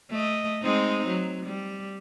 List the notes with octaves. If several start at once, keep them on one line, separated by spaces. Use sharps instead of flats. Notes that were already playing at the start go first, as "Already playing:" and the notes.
A3 D#5
G#3 C4 D#4
F#3
G3